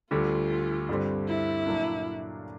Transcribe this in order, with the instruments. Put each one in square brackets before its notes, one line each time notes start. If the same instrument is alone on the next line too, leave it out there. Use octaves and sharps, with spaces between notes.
[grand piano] D2 D3 G3 [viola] F4
[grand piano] G2 D3 G3 C4
[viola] E4
[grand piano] A#2 F#3 A#3 D4